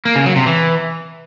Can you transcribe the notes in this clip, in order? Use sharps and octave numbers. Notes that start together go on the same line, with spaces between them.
A#3
C#3
F#3
C3
E3